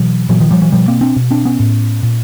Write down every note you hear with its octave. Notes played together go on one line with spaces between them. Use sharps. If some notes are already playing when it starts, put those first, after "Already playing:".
Already playing: B2 E3 F#3
A#2 E3 F#3
D#3 F3
F3 G3
E3 F#3
B2 F3 G3
A#3 C4
C4 D4
B2
C4 D4
B3 C#4
A2
A#2